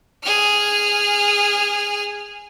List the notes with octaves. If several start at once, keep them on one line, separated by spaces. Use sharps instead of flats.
G#4 F6